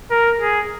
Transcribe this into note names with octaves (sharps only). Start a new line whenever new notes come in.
A#4
G#4